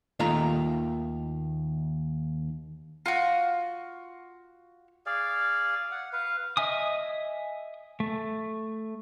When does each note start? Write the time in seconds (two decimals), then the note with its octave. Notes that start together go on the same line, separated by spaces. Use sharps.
0.19 D#2 D#3 A3 F4 F5 A#5
3.06 F4 F#4
5.06 G#4 D5 F5
5.91 F#5
6.13 B4 F5
6.57 D#5 E5 G#5 D#6
8.00 A3